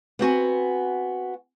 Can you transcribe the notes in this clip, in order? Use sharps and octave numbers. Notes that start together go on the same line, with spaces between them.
B3 C4 F#4 G#5